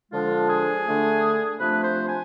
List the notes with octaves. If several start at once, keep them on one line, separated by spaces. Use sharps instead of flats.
D3 F3 G#3 D4 F4
G#4
D3 A3 D4
C3 F3 A3 D4 B4
C5
G#5